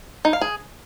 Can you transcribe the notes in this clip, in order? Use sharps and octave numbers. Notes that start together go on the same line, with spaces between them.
D#4
F5
G#4